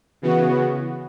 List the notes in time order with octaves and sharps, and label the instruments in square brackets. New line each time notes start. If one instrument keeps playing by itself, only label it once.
[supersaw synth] C#3 E3 B3 F#4